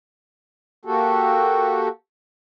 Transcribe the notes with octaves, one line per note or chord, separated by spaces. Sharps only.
A#3 F#4 G4 A4